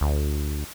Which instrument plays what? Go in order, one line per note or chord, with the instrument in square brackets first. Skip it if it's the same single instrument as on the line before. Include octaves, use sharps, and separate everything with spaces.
[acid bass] D2